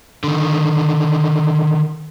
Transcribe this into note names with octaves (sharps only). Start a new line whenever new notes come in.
D3 D#3